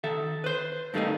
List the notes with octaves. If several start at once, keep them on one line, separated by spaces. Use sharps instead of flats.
D#3 A4 E5
B4 C5
G2 D#3 A3 A#3 C#4 D#4